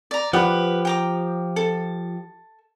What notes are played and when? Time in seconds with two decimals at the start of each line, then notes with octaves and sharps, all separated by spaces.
0.11 D5 A#5
0.33 F3 G4 B4 F#5 D#6
0.85 G5 A#5 D6
1.56 A4